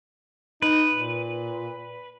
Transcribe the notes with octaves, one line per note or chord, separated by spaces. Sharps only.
D#4 B4
A#2